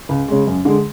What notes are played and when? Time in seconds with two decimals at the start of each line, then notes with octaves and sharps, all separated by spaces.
0.09 C#2
0.28 C#3 G#3
0.47 F#2
0.65 D3 G#3